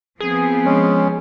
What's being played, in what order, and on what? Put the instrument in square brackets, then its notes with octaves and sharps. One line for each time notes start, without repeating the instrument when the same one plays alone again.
[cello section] F3 B3 C4 [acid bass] G#4
[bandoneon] G#3 C#4